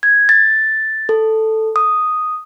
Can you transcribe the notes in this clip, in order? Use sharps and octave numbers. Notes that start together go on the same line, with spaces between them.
G#6
A6
A4
D#6